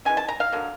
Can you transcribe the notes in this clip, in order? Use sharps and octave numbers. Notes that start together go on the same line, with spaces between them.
E3 G#3 C#4 G#5
A5
A#5
F5
D3 F#3 A#3